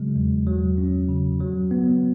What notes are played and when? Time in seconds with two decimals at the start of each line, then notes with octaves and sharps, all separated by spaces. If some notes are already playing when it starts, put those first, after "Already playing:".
Already playing: C#3 F#3 G#3
0.16 E2
0.47 F#3
0.78 C#4
1.09 C#3
1.40 F#3
1.71 B3